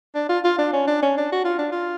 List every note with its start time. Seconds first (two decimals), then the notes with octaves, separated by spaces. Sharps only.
0.15 D4
0.29 F4
0.44 F4
0.58 D4
0.73 C#4
0.87 D4
1.02 C#4
1.17 D4
1.32 F#4
1.45 F4
1.58 D4
1.72 F4